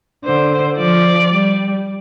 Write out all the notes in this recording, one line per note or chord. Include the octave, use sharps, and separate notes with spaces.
D3 C5
F3 D5
G3